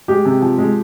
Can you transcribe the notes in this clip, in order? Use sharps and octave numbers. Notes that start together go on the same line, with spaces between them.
G#3 G4
C3
F3
G#3